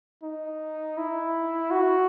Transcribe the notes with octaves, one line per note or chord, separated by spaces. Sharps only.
D#4
E4
F#4